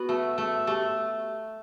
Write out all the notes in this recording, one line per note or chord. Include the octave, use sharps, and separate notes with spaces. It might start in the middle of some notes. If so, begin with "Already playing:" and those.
Already playing: B3 F#4
A3
A3
A3 G4